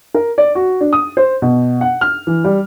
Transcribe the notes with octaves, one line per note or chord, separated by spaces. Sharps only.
A#4
D5
F#4
D4
D#6
C5
B2
F#5
F6
E3
G3